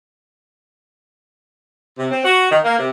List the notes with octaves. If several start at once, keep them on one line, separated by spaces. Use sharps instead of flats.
C3
C4
F#4
D#3
A#3
C3